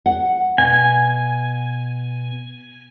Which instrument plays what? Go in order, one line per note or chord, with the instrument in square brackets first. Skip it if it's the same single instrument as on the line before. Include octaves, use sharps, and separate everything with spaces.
[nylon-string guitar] F#5
[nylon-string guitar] B2 [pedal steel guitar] G#5